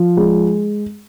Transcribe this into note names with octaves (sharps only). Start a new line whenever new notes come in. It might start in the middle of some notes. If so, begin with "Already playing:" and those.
Already playing: F3
G#3